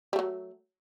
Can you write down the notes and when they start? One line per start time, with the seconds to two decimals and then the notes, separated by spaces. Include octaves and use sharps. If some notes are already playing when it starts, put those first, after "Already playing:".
0.13 G3
0.16 A3
0.19 F#3